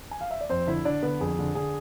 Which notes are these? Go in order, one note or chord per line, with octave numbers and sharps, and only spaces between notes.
G#5
F5
E5
D5
F2 C4 C5
D3 E4 E5
D3 D4 D5
D3 B3 B4
F2 G#4
D3
D3 G#4